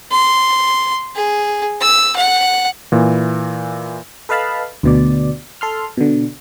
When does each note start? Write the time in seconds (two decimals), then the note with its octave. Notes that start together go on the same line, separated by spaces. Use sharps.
0.11 C6
1.15 G#4
1.81 E6
2.16 F#5
2.92 A#2 E3
4.29 A4 B4 D#5 F5 A5 B5
4.83 D2 B2 D5
5.61 A4 C6 F6
5.97 B2 D3